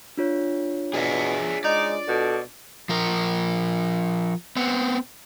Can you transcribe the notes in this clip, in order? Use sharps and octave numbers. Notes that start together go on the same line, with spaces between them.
D4 F4 C#5
B2 G#4 D5 E5
G#3 D#4 D5
B2 A4
F3 A#4
B3 C4